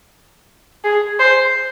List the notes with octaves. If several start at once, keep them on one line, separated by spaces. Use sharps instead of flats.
G#4
C5